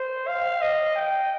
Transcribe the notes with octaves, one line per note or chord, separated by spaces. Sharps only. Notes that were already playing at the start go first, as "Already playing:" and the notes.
Already playing: C5
F5
D#5
G5